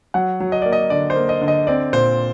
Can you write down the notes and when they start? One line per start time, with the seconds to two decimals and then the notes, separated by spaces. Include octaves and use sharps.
0.14 F#3 F#5
0.40 F#3
0.52 D#5
0.62 A#3 D5
0.73 D#5
0.90 D3 D5
1.10 C5
1.16 A#3
1.29 D#5
1.41 D3
1.48 D#5
1.67 C4 D5
1.93 A#2 C5